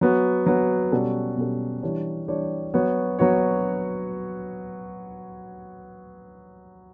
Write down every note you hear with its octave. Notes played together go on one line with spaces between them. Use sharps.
F#3 B3 F#4
F#3 B3 F#4
B2 G3 C#4 F#4 A4
B2 G3 C#4 F#4 A4
E3 G3 D4 G4 C#5
E3 G3 D4 G4 C#5
F#3 B3 F#4 C#5
F#3 B3 F#4 C#5